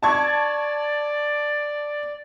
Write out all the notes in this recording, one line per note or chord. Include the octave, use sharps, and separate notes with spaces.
D5 A5 C#6 G#6